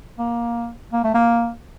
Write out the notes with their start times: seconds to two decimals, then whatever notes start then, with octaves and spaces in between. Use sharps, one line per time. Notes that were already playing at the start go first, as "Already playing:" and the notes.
0.19 A#3
0.93 A#3
1.04 A3
1.14 A#3